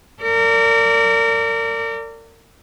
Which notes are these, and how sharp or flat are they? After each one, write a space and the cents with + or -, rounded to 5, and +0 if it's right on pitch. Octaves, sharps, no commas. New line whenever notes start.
A#4 -35 D5 -25